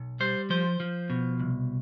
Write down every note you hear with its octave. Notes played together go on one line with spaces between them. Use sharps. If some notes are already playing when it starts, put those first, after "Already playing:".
Already playing: B1
G3 C5
F3 C5
F3
B2
C2